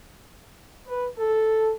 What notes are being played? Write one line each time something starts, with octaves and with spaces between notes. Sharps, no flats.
B4
A4